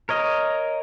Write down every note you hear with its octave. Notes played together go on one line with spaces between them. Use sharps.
A#4 C#5 D#5